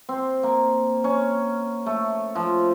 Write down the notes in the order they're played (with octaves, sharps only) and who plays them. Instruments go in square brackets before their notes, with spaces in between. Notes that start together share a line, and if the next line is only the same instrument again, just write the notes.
[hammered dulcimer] C4
A#3
C#4
A3
F3